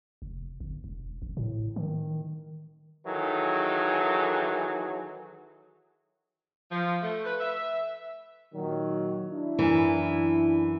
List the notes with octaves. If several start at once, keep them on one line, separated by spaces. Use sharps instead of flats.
F1
G1
E1
G#1
A2
D#3
D#3 E3 F#3 G#4 A4
F3
A3
B4
E5
A#2 D#3 F#3
D4 E4
F#2 E3